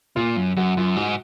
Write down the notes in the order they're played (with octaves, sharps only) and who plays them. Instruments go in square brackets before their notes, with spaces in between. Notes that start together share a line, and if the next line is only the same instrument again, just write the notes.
[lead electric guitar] A#2 [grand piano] F4
[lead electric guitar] F#2
[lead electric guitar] F#2 [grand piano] F#4
[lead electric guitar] F#2 [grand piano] F4
[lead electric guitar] G#2 [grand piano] F#4